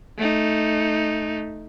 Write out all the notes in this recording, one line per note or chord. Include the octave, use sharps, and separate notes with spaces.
A3 D#4